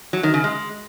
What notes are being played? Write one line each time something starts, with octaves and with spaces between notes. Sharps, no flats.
F#3
D#3
C#3
G#3